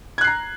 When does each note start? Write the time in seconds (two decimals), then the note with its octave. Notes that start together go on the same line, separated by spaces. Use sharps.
0.18 G#6
0.21 F#6
0.24 C7
0.27 A#5